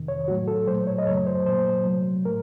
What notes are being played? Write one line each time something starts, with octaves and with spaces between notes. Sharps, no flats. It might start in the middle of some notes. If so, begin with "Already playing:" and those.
Already playing: F2 C3 D#3
C#5
A2 F#3 A3 F#4
A4
A#2 F#3 A3 C5
C#5
D#5
F#2 C#3 F#3 A3 C#5
C5
A#2 F#3 A#3 C5
C3 F#3 A3
A2 A3 A#4